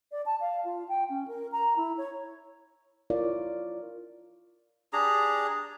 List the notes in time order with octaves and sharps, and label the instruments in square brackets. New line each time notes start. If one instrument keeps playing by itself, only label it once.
[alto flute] D5
A5
F5
F4
G5
C#4
A#4
A#5
E4
C#5
[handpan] E4 F4 A#4 C#5 D5 F5
[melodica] D4 G4 G#4 A#5